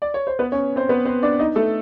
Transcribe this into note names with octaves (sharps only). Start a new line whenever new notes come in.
D5
C#5
C5
B3 B4
C#4 C#5
C4 C5
B3 B4
C4 C5
D4 D5
D#4 D#5
A3 A4